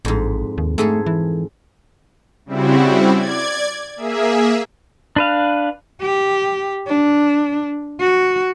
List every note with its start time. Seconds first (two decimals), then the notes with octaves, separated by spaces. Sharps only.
0.05 A1 F2 G#2
0.58 D#2
0.78 G#2 A3 G#4 A4
1.06 E3
2.46 C#3 G3 C4 E4 F#4
3.15 D5 G#6
3.96 A#3 G#4 E5
5.16 D4 B4 F5
6.01 G4
6.88 D4
8.00 F#4